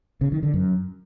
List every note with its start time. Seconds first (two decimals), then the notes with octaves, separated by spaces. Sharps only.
0.21 C#3
0.32 D#3
0.43 D3
0.54 F#2